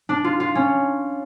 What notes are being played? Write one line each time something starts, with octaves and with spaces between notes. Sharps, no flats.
D4
F4
F4
C#4